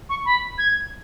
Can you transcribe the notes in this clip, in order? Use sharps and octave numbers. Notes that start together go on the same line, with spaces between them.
C#6
B5
G#6